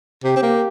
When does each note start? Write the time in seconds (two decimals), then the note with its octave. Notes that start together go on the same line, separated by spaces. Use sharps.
0.24 C3 G4
0.36 C4
0.42 A#3